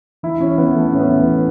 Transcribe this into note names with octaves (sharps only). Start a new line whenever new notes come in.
E3 E4
E3 C#4
E3 B3
E3 A3
A2 C#4
B3
E3
A2